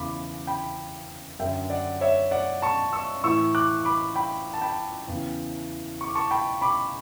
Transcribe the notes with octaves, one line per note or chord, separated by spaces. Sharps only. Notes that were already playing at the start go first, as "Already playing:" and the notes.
Already playing: E2 C#3 E3 B5 D6
G5 B5
F#2 D3 E5 G5
D5 F#5
C#5 E5
D5 F#5
A5 C#6
C#6 E6
A2 E3 C#6 E6
D6 F#6
B5 D6
G5 B5
A5
G5 B5
E2 C#3 E3
C#6
D6
A5 C#6
G5 B5
B5 D6